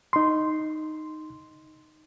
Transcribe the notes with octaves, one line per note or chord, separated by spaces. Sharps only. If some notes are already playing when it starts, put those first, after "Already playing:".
D#4 C6